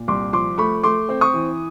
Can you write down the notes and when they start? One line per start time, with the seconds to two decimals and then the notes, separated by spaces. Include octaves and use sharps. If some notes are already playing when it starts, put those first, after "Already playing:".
Already playing: A#2
0.08 C2 C6 D6
0.33 F3 C6 D6
0.58 A3 B5 C#6
0.83 A3 C6 D6
1.09 C4
1.21 C#6 D#6
1.34 E3